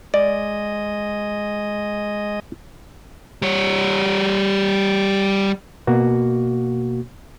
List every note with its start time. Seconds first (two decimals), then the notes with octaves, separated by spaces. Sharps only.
0.14 G#3 D5 D#5
3.42 G3 C#5
5.87 B2 A#3 F#4